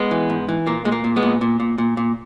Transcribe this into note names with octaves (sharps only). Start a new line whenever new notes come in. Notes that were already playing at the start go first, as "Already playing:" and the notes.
Already playing: G#3 B3
E3
G#2
E3
A#2 A#3
A#2 G#3
A#3
A#2
G#3 B3
A#2
A#2
A#2
A#2
A#2